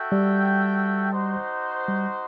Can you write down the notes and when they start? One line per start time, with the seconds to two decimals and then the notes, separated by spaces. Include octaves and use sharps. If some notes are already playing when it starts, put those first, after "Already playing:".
Already playing: F#4 A4 E5 G5
0.12 G3
1.12 D#4 F#4 C5
1.88 G3